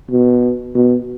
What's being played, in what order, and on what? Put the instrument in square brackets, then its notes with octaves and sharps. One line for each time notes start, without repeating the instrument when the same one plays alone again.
[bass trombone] B2
B2